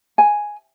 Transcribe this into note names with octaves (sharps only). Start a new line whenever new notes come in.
G#5